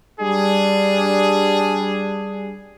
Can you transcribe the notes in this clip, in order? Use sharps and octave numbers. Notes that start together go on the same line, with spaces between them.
G3 D4 G#4